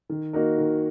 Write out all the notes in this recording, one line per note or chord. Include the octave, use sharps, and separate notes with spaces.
D#3
A#3 D#4 F#4 A#4
D#3